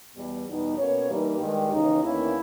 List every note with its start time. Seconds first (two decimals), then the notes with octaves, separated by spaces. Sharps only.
0.16 E2 B2 G3
0.47 E2 B2 G3 B3 D#4
0.78 B2 A#3 C#4 C#5
1.09 G2 E3 G3 A#3 D#4 G4
1.40 G2 D#3 G#3
1.71 D#2 C#3 E3 D#4
2.02 E2 D#3 A#3 C#4 E4